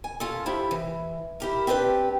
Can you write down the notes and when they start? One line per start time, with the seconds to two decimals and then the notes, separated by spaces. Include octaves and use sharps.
0.04 G#5
0.20 C#4 F4 A4
0.46 F3 E4 G4
0.71 E3
1.40 E4 G4 A#4
1.67 C4 D4 G4 B4 G5